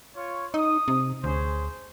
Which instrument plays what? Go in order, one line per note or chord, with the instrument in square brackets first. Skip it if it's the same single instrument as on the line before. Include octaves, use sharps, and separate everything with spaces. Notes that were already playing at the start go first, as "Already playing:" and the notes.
[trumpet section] F4 C#5
[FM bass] D#4 [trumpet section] D#6
[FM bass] C3
[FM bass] D2 [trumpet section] C#4 G#4 C5